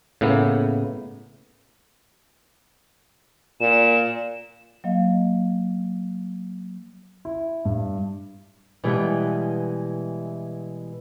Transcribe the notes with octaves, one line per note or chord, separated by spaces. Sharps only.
A2 C#3 A#3 B3
A#2 E7
F#3 A#3 D#5 F5
E4
G2
B2 E3 G3 G#3 B3